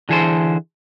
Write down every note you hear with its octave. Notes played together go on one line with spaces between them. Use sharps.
D3 E3 G#4 A4 C5